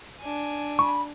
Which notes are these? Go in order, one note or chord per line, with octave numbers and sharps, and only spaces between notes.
D4 G#5
B5 C#6